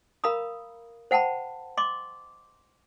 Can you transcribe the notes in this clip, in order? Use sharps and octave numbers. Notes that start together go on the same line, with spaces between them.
A#4 F5 A#5 B5 D#6
C5 F#5 G5 A5 B5
D#5 C6 D6